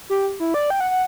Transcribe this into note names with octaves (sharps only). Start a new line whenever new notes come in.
G4
E4
D5
G5
F#5
F#5